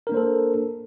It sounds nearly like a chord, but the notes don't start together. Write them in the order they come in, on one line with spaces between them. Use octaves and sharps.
A#4 D4 A#3 C5 A4